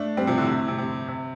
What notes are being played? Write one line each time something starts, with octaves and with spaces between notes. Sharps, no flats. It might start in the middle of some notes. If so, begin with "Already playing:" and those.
Already playing: A3 D4
G3 C4
C3 F3
A2 D3
C3
A2
C3
C3
C3